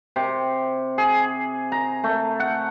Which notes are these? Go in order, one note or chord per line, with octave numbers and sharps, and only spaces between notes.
C3
G#4
A#5
A3
F#5